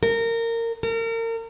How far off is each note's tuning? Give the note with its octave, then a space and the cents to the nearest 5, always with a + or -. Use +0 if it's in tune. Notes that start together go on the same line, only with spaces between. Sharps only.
A#4 -20
A#4 -35